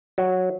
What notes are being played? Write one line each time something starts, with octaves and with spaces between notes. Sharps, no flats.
F#3